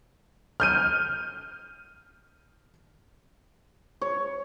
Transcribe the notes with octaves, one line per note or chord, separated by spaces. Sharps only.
F6 G6 D#7
C#5